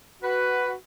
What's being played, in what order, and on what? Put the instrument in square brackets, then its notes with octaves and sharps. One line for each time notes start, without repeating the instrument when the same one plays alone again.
[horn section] F#4 B4